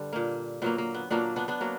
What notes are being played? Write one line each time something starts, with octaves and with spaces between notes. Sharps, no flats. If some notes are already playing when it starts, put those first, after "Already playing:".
Already playing: G2 D3 G3
A#2 A#3
A#2 F#3 A#3 B3
A#3
B3
A#2 F#3 A#3 B3 D4
B3 D4
B3 D4
F#3 A#3